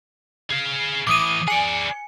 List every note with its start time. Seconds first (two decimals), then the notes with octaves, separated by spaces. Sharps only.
0.51 G#4 F5
1.07 A2 E3 D6 D#6 D#7
1.48 G#4 D5 G#5 C#7